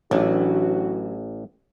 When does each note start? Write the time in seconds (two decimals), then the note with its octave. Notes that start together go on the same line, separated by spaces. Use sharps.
0.11 A1 E3 F#3 D4 F#4